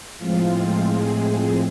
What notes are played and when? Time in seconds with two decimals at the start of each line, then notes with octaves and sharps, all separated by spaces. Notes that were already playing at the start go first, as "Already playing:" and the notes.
0.18 A2 F3 G#3 C4 F4
0.90 G#4